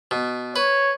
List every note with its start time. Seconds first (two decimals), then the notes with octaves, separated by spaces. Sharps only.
0.11 B2
0.56 B4 C#5